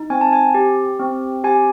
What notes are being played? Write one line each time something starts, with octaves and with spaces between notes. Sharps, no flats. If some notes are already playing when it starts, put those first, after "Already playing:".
Already playing: D#4
C4 G#5
A5
G#5
G4
C4
G4 G#5